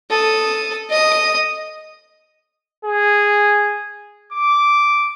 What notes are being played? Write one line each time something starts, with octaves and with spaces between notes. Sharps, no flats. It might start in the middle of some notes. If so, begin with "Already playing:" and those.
A4 D#6
D#5 D#6
G#4
D6